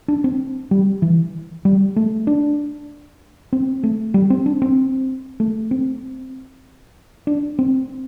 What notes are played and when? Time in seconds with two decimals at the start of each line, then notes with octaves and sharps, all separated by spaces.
0.08 D4
0.24 C4
0.71 G3
1.02 E3
1.65 G3
1.96 A3
2.27 D4
3.53 C4
3.83 A3
4.14 G3
4.30 C4
4.46 D4
4.62 C4
5.40 A3
5.71 C4
7.27 D4
7.59 C4